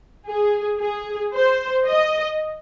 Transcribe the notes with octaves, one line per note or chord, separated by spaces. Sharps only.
G#4
G#4
C5
D#5